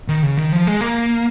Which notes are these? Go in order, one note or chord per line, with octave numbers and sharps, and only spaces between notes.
D#3
C#3
D#3
F3
G#3
A#3